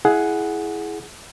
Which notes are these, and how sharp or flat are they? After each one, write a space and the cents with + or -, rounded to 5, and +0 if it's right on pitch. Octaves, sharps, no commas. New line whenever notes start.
E4 +0 G#4 +15 F#5 +0